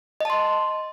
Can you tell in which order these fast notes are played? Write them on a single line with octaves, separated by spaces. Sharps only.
D#5 A5 C6